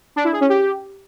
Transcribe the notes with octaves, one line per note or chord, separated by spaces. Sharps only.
D4
E4
G#4
C#4
G4